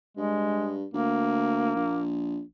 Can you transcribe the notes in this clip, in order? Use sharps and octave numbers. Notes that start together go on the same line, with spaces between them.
G2 G#3
D2 A#3
A#1